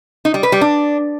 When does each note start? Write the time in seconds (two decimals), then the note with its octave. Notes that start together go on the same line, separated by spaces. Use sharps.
0.25 D#4
0.34 G3
0.43 B4
0.52 G3
0.61 D4